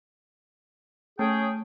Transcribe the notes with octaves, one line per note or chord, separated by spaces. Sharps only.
A3 C#4 G#4 G5